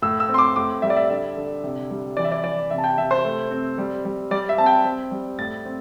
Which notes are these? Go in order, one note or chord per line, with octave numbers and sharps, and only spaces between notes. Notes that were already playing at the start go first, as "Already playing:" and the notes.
A2 E6
E6
C4
C6
D6
A2 D6
G3 E5
D5
E5
D3 E5
D3
C3
G3
E3 D5
E5
D5
E3 D5
C3 E5
A5
G5
C3 E5
C5
A3
C4
G3
G3
G3 D5
E5
C4 A5
G5
C4
G3
A2 A6
C4